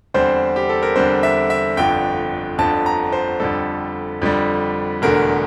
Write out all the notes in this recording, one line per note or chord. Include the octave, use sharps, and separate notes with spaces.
E2 D3 G3 C4 C5
G4
A4
A#4
E2 D3 G3 C4 C5
E5
E5
G1 F2 D3 G5
G1 F2 D3 A5
A#5
C5
F2 D3 G3 A4
F2 D3 G3
E1 E2 D3 A3 A#4